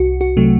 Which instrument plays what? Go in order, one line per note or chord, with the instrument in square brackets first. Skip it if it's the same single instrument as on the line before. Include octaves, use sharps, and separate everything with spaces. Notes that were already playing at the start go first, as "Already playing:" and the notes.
Already playing: [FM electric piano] C2 F#4
F#4
C3 F#3 A3